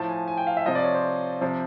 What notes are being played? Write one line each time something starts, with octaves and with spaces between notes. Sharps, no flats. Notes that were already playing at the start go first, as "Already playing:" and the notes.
Already playing: A2 F3 A5
G#5
G#5
G5
F5
E5
C3 F3 D#5
D5
C#5
C5
C3 F3